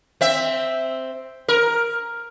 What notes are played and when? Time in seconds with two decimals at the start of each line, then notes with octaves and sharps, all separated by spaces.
0.21 C4 E5
1.48 A#4